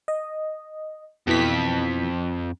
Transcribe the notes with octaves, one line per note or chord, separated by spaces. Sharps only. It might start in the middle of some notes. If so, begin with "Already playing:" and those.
D#5
F2 B2 E3 B6